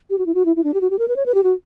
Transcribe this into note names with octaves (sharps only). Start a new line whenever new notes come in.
G4
F#4
E4
F#4
E4
E4
D4
G4
F#4
G4
A#4
B4
C#5
B4
G4
F#4